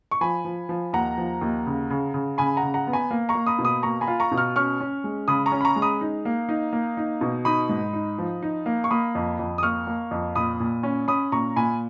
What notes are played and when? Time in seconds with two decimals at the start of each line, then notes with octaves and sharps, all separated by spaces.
0.11 C#6
0.21 F3 G#5 B5
0.45 F3
0.69 F3
0.93 D#2 F#5 A#5
1.18 F3
1.41 D#2
1.67 C#3
1.90 C#3
2.14 C#3
2.38 C#3 G#5 B5
2.57 F#5 A#5
2.63 C#3
2.74 F#5 A#5
2.87 B3
2.93 G#5 B5
3.11 A#3
3.29 A#5 C#6
3.34 A#3
3.47 B5 D#6
3.59 B2
3.65 B5 D#6
3.83 A#3 A#5 C#6
4.01 G#5 B5
4.08 F4
4.20 A#5 C#6
4.32 B2
4.38 C#6 F6
4.56 C#4 C#6 F6
4.81 C#4
5.04 G#3
5.28 C#3 B5 D#6
5.46 A#5 C#6
5.52 C#4
5.61 B5
5.65 A#5 C#6
5.76 G#3
5.82 B5 D#6
6.01 D#4
6.25 A#3
6.49 D#4
6.73 A#3
6.97 D#4
7.21 B2
7.45 D#4 B5 D#6
7.69 G#2
7.93 D#4
8.18 F3
8.42 D#4
8.66 A#3
8.84 C#6
8.91 A#3 B5 D#6
9.15 F2
9.39 F2
9.58 D#6
9.63 A#3 C#6 F6
9.87 A#3
10.11 F2
10.36 A#2 B5 D#6
10.60 A#2
10.83 C#4
11.08 C#4 B5 D#6
11.32 A#2 A#5 C#6
11.56 A#2 G#5 B5